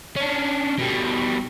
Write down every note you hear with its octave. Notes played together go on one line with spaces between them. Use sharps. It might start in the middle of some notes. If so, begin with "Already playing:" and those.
C#4 D4
B2 G3